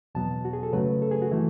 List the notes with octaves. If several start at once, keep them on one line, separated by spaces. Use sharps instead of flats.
E2 B2 F#3 B3 A5
F#4
G#4
A4
F#2 C#3 F#3 A3 B4
A4
G#4
F#4
E3 A3 E4